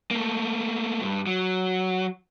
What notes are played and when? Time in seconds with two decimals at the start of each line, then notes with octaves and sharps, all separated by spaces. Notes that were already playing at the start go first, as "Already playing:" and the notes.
0.11 A3 A#3
1.02 G2
1.27 F#3